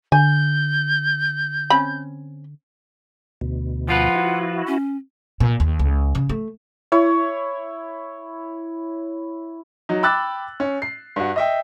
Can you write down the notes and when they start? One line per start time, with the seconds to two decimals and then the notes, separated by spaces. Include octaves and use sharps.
0.12 D3 G#5 G6
1.70 C4 C#4 B5
3.41 D2 B2
3.89 F3 F4 B4 F#5
4.15 E4 F#4
4.68 C#4
5.40 A#2
5.60 D#2
5.79 C#2
6.15 C#3
6.29 A3
6.92 E4 C#5
9.89 F#3 D#4
10.03 G5 B5 D6 E6 F#6 A6
10.60 C#4
10.82 C7
11.16 G2 F#4
11.36 D#5 E5 G5